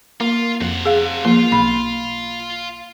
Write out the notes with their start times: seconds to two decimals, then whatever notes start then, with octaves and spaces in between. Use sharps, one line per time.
0.21 A#3 F4
0.61 F2 C3 F#5
0.85 G#4 F5
1.25 F3 A#3 F5 C6
1.52 B1 B5